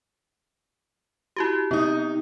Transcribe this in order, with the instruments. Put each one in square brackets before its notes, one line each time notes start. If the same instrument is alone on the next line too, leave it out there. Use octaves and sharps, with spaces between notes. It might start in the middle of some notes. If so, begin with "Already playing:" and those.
[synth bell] E4 F#4 G4
[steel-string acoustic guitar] C3 D#4 [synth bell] B3 D#6